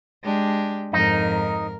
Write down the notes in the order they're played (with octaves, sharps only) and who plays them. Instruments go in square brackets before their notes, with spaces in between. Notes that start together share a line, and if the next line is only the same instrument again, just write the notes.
[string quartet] G#3 D4 G4
[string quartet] F2 G#2 A#4 [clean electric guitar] D#4